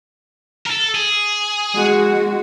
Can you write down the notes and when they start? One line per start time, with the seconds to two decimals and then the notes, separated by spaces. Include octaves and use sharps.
0.66 A4 A#4
0.95 G#4
1.75 G#3 F#4